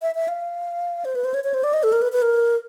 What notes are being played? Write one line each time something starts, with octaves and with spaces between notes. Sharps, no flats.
E5
E5
F5
C5
B4
C5
C#5
C#5
C5
D5
D#5
A4
A#4
B4
B4
A#4